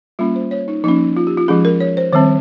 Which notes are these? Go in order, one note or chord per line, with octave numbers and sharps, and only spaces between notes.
G3 A#3 C#4 F4
C5
C#5
D#4
F3 A#3 C#4 D#4
F4
G4
F4
F3 G#3 C#4 G#4
A#4
C#5
C5
D#3 G3 C4 C5